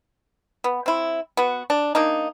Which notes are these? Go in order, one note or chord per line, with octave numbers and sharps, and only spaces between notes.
B3
C4 E4
B3 F#4
D4
A#3 D4 D#4